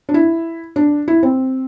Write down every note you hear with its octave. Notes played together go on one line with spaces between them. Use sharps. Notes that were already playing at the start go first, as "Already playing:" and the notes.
D4
E4
D4
E4
C4